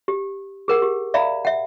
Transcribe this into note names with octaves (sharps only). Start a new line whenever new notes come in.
G4
G#4 A#4 F#5
G4
D5 E5 F5 A#5 B5
E5 F#5